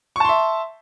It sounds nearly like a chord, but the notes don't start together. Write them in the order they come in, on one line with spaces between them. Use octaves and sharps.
C#6 A5 C6 E5